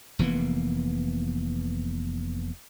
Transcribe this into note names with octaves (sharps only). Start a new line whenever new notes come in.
F1 E3 A#3 B3